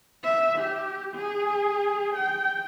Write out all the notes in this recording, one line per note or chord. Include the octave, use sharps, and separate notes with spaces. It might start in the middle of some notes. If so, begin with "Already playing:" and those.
E5
G4
G#4
G5